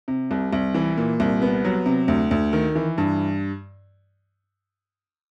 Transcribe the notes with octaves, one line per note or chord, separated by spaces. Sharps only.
C3
C2
C2
E3
A#2
C2
B3
F#3
C3
D2
D2
D#3
E3
G2